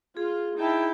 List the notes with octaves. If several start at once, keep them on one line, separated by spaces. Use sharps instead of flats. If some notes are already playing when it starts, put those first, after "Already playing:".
F4 G#4
D#4 E4 G5 A5